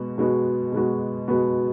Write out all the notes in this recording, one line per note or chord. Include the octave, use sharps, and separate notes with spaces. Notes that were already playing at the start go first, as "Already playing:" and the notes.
Already playing: B2 G#3 B3 F#4
B2 G#3 B3 F#4
B2 G#3 B3 F#4
B2 G#3 B3 F#4